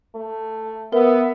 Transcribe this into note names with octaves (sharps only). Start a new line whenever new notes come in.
A3
B3 A#4 E5